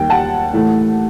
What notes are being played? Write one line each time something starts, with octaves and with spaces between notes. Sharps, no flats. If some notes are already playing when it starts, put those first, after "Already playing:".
Already playing: D#2 D#3 G3 G5
F#5 A5
A2 E3 A3